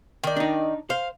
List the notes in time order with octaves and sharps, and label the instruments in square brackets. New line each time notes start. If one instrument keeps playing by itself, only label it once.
[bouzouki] D#3 D5
[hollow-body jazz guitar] D4 D#4
[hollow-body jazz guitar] C5 [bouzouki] F5